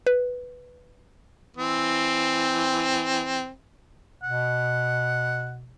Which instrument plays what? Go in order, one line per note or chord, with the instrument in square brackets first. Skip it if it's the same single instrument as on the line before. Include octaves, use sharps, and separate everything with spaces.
[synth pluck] B4
[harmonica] E3 C4
[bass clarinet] B2 [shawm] F#5